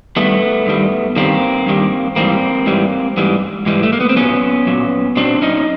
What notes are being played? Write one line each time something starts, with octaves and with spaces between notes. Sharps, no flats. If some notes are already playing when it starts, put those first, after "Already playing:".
G2 D#3 G3 A3 B3
G2 D#3 G3
G2 D#3 G3 A#3 C4
G2 D#3 G3
G#2 E3 G3 A#3 C4
G#2 E3 G3
G#2 E3 G3
G#2 E3 G3
A3
A#3
B3
C4
A#2 F#3 B3 C#4
A#2 F#3
A#2 F#3 C4 D4
C#4 D#4